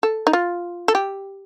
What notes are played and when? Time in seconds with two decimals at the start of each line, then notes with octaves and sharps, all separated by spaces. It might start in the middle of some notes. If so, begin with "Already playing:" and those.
0.03 A4
0.27 D#4
0.33 F4
0.88 A4
0.95 G4